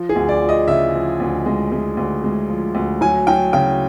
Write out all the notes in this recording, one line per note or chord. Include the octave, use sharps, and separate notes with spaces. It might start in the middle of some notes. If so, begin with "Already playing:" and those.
Already playing: F3
G#4
D2
D5
F3
D#5
C#3 E5
F3
D2
G#3
G#3
D2
G#3
F3
D2
F#3 G#5
F#3 G5
C#3 G5